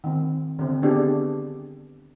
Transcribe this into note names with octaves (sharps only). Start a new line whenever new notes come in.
D#3 C4
D3 C4
B3 D4 G4 G#4